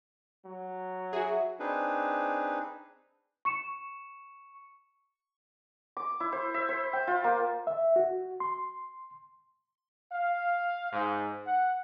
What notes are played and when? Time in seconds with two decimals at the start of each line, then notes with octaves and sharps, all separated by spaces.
0.46 F#3
1.13 F#4 G#4 E5
1.60 C4 D4 D#4 G#4 B4
3.45 C#6 C#7 E7
5.97 D6
6.20 E4
6.32 C5
6.54 E5
6.69 C5
6.93 G5
7.07 F4
7.24 A#3
7.67 E5
7.96 F#4
8.40 C6
10.11 F5
10.92 G#2
11.47 F#5